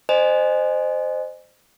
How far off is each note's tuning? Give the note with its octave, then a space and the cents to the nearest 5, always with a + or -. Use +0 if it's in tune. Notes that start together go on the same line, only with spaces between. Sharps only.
C5 -10 D#5 -30 G#5 +0